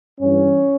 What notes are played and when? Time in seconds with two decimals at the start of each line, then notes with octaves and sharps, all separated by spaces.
0.20 G2 E3 C#4